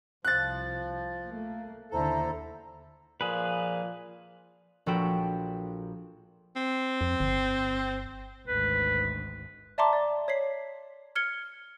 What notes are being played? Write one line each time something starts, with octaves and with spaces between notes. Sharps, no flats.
C2 F3 F#6 A6
A3 A#3
D#2 D3 E4 A4 C5 A#5
A#2 F3 G#4 B4
A#1 F#4 A4 G5 B5 E7
C4
F2
G1
G#1 D2 B4
D5 E5 A5 A#5 C6 D6
D5
C#5 B6 C7
F6 G#6 C#7 G7